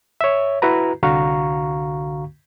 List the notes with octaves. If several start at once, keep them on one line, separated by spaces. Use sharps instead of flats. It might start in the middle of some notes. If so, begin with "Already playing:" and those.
C#5 E5
E4 F#4 B4 A#5
C2 D3 F#4 F5 A#5 C#6